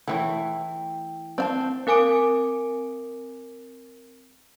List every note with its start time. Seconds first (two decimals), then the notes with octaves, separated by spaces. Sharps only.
0.08 E3 A3 E4 C#5 E5 F#5 G5
1.38 C4 D5 F5 A5
1.87 C4 A#4 G#5 D6 D7